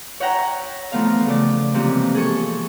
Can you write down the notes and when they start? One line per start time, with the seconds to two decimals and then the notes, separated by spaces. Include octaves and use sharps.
0.20 C#5 E5 F#5 G5 A#5
0.92 E3 F3 A3 B3 F5 A#5
1.26 C#3 A3 D5
1.74 C3 E3 F3 G#3 A#3 C4
2.15 G#4 A4 C#6